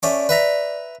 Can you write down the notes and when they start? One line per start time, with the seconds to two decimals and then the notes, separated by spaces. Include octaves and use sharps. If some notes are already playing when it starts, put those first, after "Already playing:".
0.03 A3 C#4 D5 D6
0.29 B4 E5 A#5